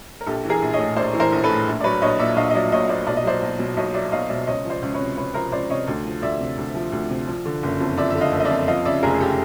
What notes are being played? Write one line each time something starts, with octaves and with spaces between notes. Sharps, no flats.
A#4
A#1 G4 A4
E3
G#4 A#4
A#1
C#5 D#5
A2
A#1 C5 D5
E3
A#4 C5
A#1
A4 B4
A2
A#1
D5
F#3 B4 C#5
A#1 C#5 D#5
A#2 D5 E5
A#1 D#5 F5
D#5
F#3 D5 E5
A#1 C#5 D#5
A#2 C5 D5
B1 D5
D#5
F#3 C5 D5
B1
B2
B1 C#5 D#5
F#3 D5 E5
B1 D#5 F5
B2 D5 E5
C#2 C#5 D#5
F3
C5 D5
C#2
B4 C#5
C3
C#2 B4 C#5
F3 A#4 C5
C#2 C5 D5
C3 C#5 D#5
D2
F3
D2 D5 E5
C3
D2
F3
D2
C3
F3
D3
F#1
F2
F3 D5 E5
D3 E5
D#5 F5
F#1
D#5
F2 D5 E5
F3 D#5 F5
C#3 D5 E5
F1 G#4 A#4
G#4
G4 A4